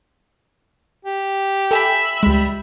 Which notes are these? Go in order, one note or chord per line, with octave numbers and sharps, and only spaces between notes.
G4
A4 E5 G5 G#5 B5
C#2 G3 G#3